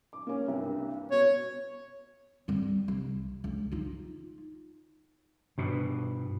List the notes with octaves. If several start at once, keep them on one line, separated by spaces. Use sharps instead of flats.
D6
A#3 C#4
C2 G2
B2 C#5
G3 C4
C2
C#2
D#4 F4
G2 B2